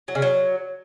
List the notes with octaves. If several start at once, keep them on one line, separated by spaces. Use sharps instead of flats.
F#3
C#3
F#3